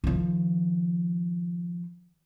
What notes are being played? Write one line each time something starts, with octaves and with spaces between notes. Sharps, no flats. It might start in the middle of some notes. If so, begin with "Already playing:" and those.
D#3 F3